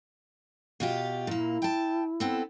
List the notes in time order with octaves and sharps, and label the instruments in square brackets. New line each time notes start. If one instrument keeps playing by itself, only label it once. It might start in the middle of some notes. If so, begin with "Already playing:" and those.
[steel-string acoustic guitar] B2 F4 G4
[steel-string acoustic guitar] A#2 A#3 [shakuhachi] E4
[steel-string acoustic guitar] G5 A5
B3 C4 A4